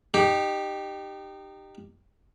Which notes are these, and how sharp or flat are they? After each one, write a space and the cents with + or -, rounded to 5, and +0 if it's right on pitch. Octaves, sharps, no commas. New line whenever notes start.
D#4 -25 G4 +0